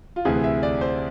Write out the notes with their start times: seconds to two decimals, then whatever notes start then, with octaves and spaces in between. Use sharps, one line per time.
0.16 F4
0.25 D2 C3 E3 G#4
0.44 E5
0.63 D5
0.81 C5